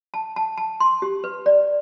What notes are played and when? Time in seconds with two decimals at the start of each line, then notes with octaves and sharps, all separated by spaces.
0.14 A5
0.36 A5
0.58 A5
0.80 C6
1.02 G4
1.24 B4
1.46 D5